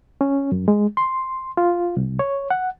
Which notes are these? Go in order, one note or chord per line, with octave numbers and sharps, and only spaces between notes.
C#4
F#2
G#3
C6
F4
C2
C#5
F#5